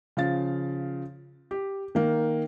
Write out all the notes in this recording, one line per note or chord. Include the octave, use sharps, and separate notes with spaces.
C#3 F3 F5 A6
G4
D#3 A#3